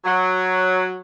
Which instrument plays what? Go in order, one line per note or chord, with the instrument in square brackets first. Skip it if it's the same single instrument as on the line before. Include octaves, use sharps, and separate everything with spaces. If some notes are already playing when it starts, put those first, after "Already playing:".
[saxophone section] F#3